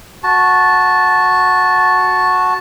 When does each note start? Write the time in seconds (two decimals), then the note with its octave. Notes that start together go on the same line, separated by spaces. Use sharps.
0.23 F#4 A5